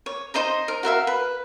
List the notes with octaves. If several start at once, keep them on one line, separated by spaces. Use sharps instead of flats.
C#5
D#4 C5 D#5 A#5
A#4
F#4 A#4 E5 F5
B4